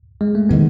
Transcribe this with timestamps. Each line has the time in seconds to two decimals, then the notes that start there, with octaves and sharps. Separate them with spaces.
0.21 G#3
0.35 A3
0.49 C3 D#3 G#3 B3